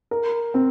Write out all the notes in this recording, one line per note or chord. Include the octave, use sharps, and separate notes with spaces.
A#4
C4